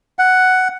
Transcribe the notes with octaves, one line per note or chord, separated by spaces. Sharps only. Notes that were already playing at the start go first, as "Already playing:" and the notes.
F#5